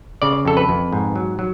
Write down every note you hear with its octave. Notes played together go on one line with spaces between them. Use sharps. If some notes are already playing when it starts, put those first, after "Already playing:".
C#3 D5
F2 A4
B4
F2
G#2
F#3
F#3